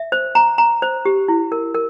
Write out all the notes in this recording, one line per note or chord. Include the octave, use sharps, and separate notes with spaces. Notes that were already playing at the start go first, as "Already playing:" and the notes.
Already playing: E5
C5
A#5
A#5
C5
G4
E4
A#4
A#4